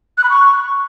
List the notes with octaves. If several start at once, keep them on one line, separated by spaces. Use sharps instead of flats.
F#6
B5
C#6